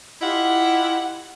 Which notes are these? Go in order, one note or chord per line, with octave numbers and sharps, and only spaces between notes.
E4 F4 G4 D#5 F#5